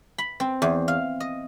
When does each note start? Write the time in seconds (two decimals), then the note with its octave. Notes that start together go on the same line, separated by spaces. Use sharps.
0.18 B5
0.40 C4
0.62 E2
0.88 F5
1.20 D#5